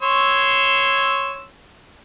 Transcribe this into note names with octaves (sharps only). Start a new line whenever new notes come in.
C#5 C6 E6